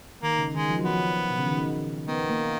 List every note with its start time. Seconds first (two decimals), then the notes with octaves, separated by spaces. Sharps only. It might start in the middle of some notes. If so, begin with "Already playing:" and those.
0.23 D#3 A#3
0.38 C#3
0.54 D#3 G#3
0.69 F3
0.79 F#3
0.85 F3 B3
1.30 B2
1.39 C#3
1.47 D#3
2.08 D#3 B3
2.30 A#3